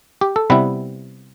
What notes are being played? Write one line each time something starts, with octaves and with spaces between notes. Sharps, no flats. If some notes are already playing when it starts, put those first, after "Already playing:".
G4
A4
C3 G3 B3 E4 B4